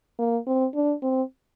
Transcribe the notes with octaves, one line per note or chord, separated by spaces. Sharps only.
A#3
C4
D4
C4